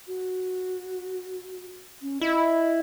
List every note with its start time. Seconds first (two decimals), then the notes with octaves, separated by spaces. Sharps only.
0.08 F#4
2.02 C#4
2.21 E4 D#5